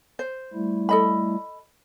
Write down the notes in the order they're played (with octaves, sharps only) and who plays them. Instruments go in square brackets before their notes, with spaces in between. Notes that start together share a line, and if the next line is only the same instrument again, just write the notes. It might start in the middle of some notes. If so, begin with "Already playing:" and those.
[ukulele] C5
[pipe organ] G3 A3 E4
[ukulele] A4 D#5 B5